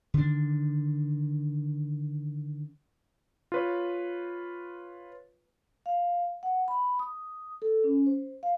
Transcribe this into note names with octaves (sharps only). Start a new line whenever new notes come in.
D3 D#3 D4
F4 B4 C#5
F5
F#5
B5
D#6
A4
C#4
C5
F5